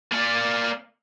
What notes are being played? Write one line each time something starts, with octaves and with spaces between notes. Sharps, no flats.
A#3 D5